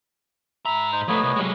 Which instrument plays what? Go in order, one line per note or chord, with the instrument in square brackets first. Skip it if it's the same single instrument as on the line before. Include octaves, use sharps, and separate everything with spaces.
[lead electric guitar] G#2 A#5 [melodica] E5 B5
[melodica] D#4 C5
[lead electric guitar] F3 A3 [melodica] B3 C#5 D#5
[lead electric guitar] C2
F#3 G#3